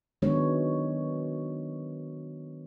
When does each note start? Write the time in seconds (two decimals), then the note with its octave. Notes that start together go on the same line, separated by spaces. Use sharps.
0.22 D#3 F#3 G#3 B3 D4 C#5